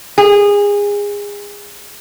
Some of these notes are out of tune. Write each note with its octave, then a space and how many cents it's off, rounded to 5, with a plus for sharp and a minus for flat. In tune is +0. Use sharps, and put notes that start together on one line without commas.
G#4 -25